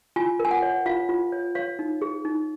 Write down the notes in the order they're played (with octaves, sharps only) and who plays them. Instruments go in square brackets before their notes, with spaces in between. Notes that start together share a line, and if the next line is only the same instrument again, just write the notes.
[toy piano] F4 G#5
A#4
G#5
F#5
C#5
F4 F5
F4
C#5
C#5 F5
D#4
G#4
D#4